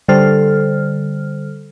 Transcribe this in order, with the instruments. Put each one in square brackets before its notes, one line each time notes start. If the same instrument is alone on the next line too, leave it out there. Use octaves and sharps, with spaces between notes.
[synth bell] D3 G3 A4 C5 F6